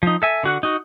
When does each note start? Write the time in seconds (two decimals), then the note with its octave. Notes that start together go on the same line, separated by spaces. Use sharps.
0.03 F3 D#4
0.22 A4 E5 G#5
0.43 D3 F#4 F#5
0.63 D#4 F#4